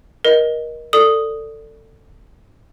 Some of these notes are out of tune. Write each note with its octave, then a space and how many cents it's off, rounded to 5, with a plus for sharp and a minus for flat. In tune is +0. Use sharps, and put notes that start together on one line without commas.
A#4 +25 D#5 +0
A4 +20 D5 +0 D#6 +0